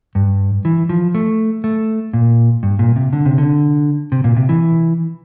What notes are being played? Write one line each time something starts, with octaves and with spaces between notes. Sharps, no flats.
G2
E3
F3
A3
A3
A#2
G2
A#2
C3
D3
C3
D3
C3
A#2
C3
E3